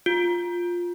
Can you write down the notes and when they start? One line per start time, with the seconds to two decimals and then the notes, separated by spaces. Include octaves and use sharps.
0.06 F4